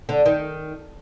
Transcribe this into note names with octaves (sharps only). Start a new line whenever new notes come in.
D3
D#3